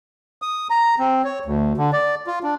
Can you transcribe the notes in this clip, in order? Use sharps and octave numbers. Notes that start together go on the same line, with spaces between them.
D#6
A#5
C4
C#5
D2
D3
D5
F4
D4